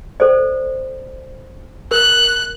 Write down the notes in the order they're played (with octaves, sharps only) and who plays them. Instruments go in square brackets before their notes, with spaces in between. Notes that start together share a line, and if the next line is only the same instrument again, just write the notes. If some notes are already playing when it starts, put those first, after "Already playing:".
[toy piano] A4 C5 D5
[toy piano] A#4 [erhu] F#6